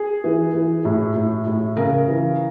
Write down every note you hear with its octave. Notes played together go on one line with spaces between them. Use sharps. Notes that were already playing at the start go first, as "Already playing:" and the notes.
Already playing: G#4
E3
E3
A2
A2
A2
C#3 A#4
E3